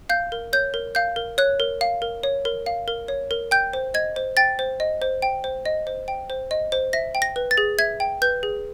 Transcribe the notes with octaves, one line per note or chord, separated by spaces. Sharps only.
F5 G6
A#4
C#5 G6
A#4
F5 G6
A#4
C#5 F#6
A#4
F5
A#4
C#5
A#4
F5
A#4
C#5
A#4
G5 G6
C5
D#5 G#6
C5
G5 A6
C5
D#5
C5
G5
C5
D#5
C5
G5
C5
D#5
C5
E5 A#6
G5
A#6
B4
A6
G#4
E5 G#6
G5
B4 G6
G#4